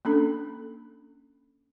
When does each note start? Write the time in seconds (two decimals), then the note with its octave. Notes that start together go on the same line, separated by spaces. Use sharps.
0.05 A#3 C#4 D4 A4